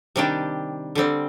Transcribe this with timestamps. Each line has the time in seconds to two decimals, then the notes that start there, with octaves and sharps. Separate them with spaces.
0.16 C3 D#3 G3 D4 G4
0.95 D3 G3 C4